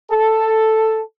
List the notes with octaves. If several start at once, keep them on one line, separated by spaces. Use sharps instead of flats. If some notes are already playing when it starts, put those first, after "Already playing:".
A4